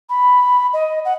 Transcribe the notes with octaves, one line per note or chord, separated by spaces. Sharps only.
B5
D#5
F#5